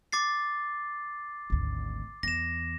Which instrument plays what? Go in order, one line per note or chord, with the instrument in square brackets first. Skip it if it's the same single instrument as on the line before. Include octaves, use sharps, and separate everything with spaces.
[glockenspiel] D6 A6 C7
[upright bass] G#1 D2
[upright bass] E2 [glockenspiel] A#6 E7